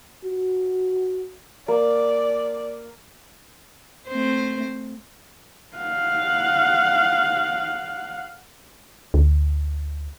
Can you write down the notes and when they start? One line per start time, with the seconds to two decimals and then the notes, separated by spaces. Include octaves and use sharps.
0.24 F#4
1.68 A#3 D5
4.08 A3 C4 C5
5.77 F5 F#5
9.14 D2